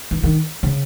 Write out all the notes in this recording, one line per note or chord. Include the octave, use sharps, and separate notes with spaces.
E3
D#3
C#3